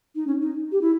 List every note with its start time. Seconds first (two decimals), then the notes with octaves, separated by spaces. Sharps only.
0.15 D#4
0.27 C#4
0.41 D#4
0.72 G4
0.81 E4